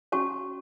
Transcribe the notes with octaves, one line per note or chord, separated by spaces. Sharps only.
C#4 F#4 C#5 A5 C#6